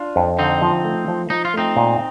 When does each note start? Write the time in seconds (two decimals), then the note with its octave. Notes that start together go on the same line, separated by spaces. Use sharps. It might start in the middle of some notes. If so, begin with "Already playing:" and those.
Already playing: D4 F4
0.16 F2
0.38 D3 C4 D#4
0.62 F3
0.85 A3
1.08 F3
1.30 F3 D#4
1.45 F4
1.54 A3 C4 D#4
1.77 A#2